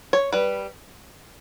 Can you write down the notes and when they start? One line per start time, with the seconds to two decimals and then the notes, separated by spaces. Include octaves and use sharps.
0.13 C#5
0.33 G3 B4